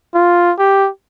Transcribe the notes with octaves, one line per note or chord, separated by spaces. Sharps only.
F4
G4